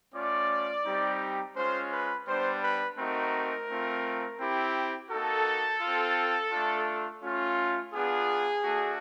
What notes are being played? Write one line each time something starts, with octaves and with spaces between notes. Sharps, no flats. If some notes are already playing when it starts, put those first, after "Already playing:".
A3 C#4 F4 D5
G3 C4 D#4 G4
G#3 C#4 F4 C5
B4
G3 B3 D4 C5
B4
A3 C4 D#4 F#4 A#4
A3 C4 F4
C4 E4 G4
A#3 D#4 F#4 A4
C4 F4
A3 D4 F4
A3 C#4 F4
B3 D4 F4 G#4
A3 D4 F#4